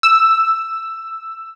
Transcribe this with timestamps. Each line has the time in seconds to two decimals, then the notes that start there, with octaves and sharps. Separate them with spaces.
0.03 E6